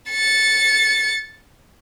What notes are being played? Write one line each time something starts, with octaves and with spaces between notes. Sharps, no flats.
A6 C#7